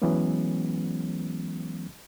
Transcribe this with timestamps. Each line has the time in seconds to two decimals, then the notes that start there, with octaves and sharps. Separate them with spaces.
0.02 E3 F#3 G#3 B3 C#4